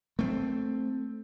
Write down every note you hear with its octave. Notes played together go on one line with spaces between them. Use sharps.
A3 C4